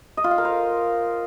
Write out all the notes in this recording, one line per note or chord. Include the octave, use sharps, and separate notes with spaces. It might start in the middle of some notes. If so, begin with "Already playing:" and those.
D#5
F4
F5
A#4
C5